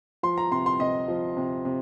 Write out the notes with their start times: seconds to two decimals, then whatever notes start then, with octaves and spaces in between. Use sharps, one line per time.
0.23 F3 C6
0.38 A#5
0.51 C3 C6
0.66 C6
0.80 C3 D#5
1.08 F3
1.37 C3
1.65 C3